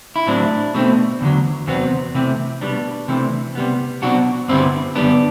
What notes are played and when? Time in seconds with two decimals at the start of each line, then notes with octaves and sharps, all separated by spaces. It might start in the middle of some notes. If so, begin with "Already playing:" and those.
0.16 E4
0.27 A2 F#3 C4 D4
0.75 B2 A3 C4
1.21 E2 D3 F#3
1.67 E2 C3 F#3 B3 C4
2.15 C3 E3 A3 C4
2.61 B2 G3 B3 D4
3.08 C3 E3 A3 C4
3.55 C3 G3 B3
4.02 B2 F#3 C4 D4 F#4
4.48 G2 D3 G3 B3 C4 E4
4.95 F#2 D3 G3 B3 D4